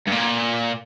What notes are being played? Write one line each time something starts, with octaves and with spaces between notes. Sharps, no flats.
G2
A#2